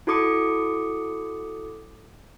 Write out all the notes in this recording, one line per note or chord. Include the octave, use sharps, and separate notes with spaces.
E4 F#4 A4 D6 D#6 C#7